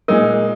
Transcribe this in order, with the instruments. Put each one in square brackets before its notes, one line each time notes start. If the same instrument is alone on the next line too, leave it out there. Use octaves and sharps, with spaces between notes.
[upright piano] A#2 G#3 D#4 [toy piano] A#4